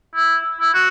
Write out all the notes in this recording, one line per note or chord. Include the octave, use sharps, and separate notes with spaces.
E4
E4
F#4